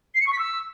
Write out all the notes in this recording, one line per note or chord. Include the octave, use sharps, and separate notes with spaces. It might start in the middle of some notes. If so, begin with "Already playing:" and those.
C7
C#7
C#6
B6
E6